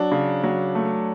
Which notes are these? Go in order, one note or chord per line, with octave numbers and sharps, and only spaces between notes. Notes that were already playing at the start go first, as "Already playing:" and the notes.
Already playing: F#3 D4
C#3
F#3
A3